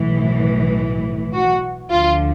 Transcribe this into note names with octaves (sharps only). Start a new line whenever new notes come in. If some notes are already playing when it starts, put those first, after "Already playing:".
Already playing: B1 A2 E3
F#4
D2 D3 F3 F4